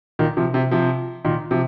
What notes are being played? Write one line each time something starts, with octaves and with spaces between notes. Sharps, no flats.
A#2 D#3
C3 F3
C3
C3 F3
A#2 D#3
C3 F3